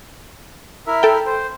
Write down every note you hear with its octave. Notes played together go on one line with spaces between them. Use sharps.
E4 A#4 E5
A4 G5
C5